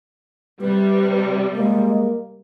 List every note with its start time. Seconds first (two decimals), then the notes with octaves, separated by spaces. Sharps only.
0.61 C3 G3 B4
1.55 G#3 A#3